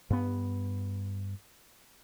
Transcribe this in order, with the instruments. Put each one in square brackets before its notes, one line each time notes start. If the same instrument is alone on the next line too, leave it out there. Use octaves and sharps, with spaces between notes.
[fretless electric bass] G2 B3